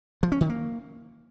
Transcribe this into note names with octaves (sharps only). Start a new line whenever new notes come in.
F3
C#4
D#3
A#3